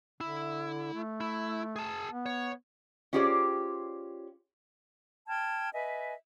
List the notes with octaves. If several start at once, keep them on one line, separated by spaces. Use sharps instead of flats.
D3 E4
A3
E4
G#4 A5
B3
C#5
C#4 F4 G4 G#4 C5 D5
G5 A5 F6 G#6
B4 D#5 E5 G#5